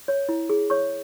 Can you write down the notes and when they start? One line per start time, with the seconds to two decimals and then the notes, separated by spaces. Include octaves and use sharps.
0.08 C#5
0.29 E4
0.50 G#4
0.70 C#5 C#6